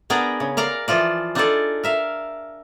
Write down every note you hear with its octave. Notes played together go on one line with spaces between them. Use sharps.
B3 D4 G#4 A#4 D5 A#5
C#3
A#4 D5 F5 A#5
E3 F3 F4 D5
D4 D#4 F4 G#4 A4 D5
A#4 E5 F5